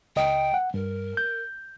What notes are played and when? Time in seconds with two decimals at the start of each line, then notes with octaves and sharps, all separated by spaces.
0.16 C#2 D#5 G5
0.54 F#5
0.74 G2 A#4
1.17 G6